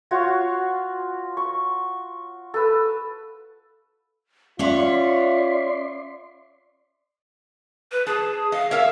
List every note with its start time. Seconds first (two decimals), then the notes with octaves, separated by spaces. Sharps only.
0.11 F4 F#4 C#5
1.37 C#6
2.54 A4 B4
4.59 C#4 F4 C#5 D5 E5 F#5 C6
7.92 B4
8.07 G#4 A5
8.52 D#5 F5
8.71 A#4 C#5 E5 F5